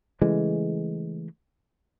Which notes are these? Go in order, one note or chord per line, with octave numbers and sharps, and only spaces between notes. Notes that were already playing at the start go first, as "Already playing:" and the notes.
C#3 E3 G#3 A3